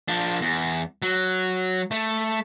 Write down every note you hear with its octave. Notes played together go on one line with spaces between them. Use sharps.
F3 D4
E2
F#3
A3